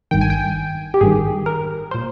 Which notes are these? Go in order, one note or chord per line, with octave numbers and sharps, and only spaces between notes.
G#1 G2 D#3 G5
G#5
G5
G4
G#1 G2 D#3 G#4
A#4
A#2 C5